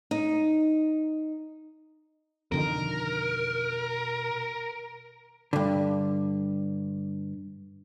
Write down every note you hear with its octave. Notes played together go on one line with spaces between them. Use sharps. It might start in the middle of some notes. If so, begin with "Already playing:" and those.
D#4
F2 B2 D3 D#3 A#4
G2 D3